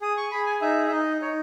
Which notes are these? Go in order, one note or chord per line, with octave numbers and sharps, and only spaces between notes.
G#4 D#6
C#6
G#4 B5
G#5
D#4 E5
E5
D#4 D#5
D#4 C#5